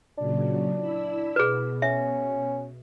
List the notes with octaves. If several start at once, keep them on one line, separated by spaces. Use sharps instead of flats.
A#2 C#3 F#3 D4
E4 B5 E6
B2 G#4 B4
C#4 E5